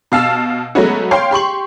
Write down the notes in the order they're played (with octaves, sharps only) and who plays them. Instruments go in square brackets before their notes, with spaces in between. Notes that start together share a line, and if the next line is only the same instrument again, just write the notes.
[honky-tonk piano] B2 F5 A5 E6
F#3 G#3 A3 B3 C#4 F#4
C#5 F5 G5 C6
G4 C6 C#6 F#7